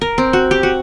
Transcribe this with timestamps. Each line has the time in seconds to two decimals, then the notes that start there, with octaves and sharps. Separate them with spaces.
0.01 A#4
0.18 C4
0.33 F#4
0.51 G4
0.63 F#4